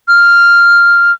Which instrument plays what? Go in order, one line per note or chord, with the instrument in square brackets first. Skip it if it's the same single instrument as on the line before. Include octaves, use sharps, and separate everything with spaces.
[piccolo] F6